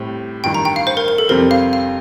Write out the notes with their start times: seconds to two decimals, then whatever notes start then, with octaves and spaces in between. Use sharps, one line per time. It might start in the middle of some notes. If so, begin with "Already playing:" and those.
Already playing: A2 G3 C4 G4
0.44 A1 G2 D#3 G5
0.54 A#5
0.65 G5
0.76 F5
0.87 C5
0.97 A#4
1.08 A#4
1.18 A4
1.29 F2 C3 G3 C4 A#4
1.51 F5
1.73 F5